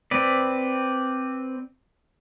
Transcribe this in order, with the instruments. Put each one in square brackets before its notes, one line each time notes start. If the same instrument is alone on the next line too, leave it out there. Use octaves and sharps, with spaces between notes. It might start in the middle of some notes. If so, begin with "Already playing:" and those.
[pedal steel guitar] C4 B4 D5